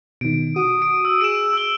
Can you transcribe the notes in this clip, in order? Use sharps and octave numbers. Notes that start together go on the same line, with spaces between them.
B2 D#3 D7
F#4 D#6
D7
E6
G#4 D7 E7
E6 G7